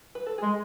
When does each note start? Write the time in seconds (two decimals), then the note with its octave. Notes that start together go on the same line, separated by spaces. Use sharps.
0.15 B4
0.26 A4
0.38 G#3 G#4